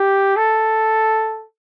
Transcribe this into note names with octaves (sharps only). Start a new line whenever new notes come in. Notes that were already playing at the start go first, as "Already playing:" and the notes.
Already playing: G4
A4